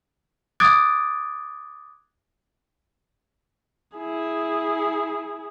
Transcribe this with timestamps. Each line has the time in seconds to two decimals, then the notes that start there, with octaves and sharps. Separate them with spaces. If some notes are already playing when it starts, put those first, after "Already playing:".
0.60 D6 D#6 F#6 G#6 A6 D7
3.97 E4 G#4